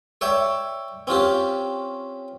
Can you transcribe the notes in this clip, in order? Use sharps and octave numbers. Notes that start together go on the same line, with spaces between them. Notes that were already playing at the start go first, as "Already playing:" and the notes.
C#5 D5 E5 G5
C4 C#4 F4 G4